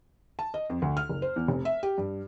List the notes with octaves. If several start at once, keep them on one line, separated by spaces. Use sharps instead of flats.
A5
D#5
F2
D2
F6
F#1
C5
E2
F1
E5
G4
G2